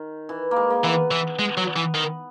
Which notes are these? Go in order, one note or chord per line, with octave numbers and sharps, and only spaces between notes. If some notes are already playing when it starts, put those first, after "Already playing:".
Already playing: D#3
E3
A#3
G#3
A#3
E3 B3
E3
G#3
F#3
E3
D#3